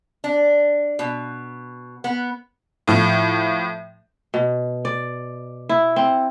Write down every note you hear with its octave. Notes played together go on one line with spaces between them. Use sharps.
D4
B2
B3
A2 F3
B2
D5
E4
C4